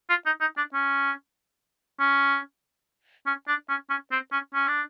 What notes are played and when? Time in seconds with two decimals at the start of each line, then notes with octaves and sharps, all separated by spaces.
0.10 F4
0.26 D#4
0.41 D#4
0.57 D4
0.73 C#4
2.00 C#4
3.27 C#4
3.48 D4
3.69 C#4
3.90 C#4
4.11 C4
4.32 C#4
4.54 C#4
4.68 D4